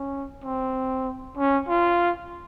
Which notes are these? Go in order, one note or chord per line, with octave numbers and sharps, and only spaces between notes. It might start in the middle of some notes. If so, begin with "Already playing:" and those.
Already playing: C#4
C4
C#4
F4